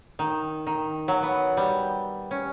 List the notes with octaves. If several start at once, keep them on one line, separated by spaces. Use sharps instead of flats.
D#3
D#3
F#3
B3
G3
C#4